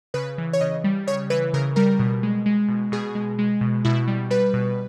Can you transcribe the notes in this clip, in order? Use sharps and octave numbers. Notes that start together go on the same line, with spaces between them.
C#3 B4
E3
C#5
C#3 D#5
G3
C#3 C#5
E3 B4
C#3 A#4
G3 A#4
B2
G#3
G#3
B2
B2 G#4
G#3
G#3
B2
B2 E4
G3
G3 B4
B2